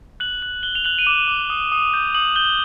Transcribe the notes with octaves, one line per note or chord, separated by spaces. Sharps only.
F#6 F#7
F#6 F#7
F#6 G7
F7
F#6 F#7
D#7
D6 E7
D6
D#6
D#6
G6
D#6 F#7
G6 G7